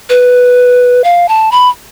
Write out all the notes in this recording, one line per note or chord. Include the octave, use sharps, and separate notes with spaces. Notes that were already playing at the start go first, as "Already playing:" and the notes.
B4
F5
A5
B5